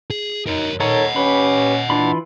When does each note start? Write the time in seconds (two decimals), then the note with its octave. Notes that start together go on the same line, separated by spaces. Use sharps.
0.10 G#4
0.47 D#4 A#4 C#5
0.80 D#3 A4 C#5 D#5 F#5 A#5
1.16 C#4 G4 B4 B5
1.90 E3 D4 F4 B5